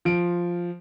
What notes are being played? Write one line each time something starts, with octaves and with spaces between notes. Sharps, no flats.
F3 D7